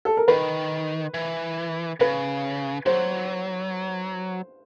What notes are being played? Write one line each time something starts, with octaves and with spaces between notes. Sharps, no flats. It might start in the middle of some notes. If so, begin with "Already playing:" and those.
A4
A#4
D#3 B4
E3
C#3 B4
F#3 C5